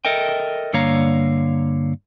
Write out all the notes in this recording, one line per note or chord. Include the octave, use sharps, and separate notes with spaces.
A4 A#4 D#5 E5 G5
G2 D3 A#3 C#5 F5 A#5